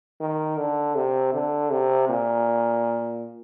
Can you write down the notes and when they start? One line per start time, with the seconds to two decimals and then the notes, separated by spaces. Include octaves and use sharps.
0.20 D#3
0.58 D3
0.95 C3
1.33 D3
1.71 C3
2.09 A#2